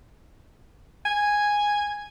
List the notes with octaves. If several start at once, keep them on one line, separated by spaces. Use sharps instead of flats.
G#5